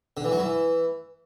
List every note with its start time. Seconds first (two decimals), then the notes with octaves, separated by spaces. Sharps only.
0.17 D3
0.24 E3
0.32 F#3
0.39 E3